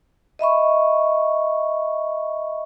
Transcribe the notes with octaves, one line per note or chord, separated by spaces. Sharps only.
D#5 E5 B5 C#6